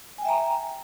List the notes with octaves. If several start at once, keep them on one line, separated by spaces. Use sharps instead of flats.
E5 G5 G#5 A#5